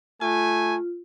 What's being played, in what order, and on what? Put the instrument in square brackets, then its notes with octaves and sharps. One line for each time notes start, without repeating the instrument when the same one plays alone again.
[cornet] A3 [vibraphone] F4 [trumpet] G#5